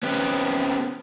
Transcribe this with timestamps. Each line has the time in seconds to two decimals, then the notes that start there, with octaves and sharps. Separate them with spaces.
0.03 B3 C#4 G4